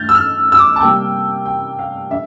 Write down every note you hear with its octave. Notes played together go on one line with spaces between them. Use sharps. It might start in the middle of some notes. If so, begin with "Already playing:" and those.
Already playing: D3 A3 F6 G6 A6
E6
F6
E6
D6
A5
C3 G3 A#3 G5
G5
F5
D3 E5